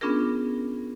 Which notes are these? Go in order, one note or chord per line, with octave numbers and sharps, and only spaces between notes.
B3 C#4 D4 F4 G#4 A#4